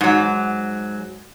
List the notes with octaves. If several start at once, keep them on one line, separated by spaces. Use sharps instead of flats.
G#2 F#3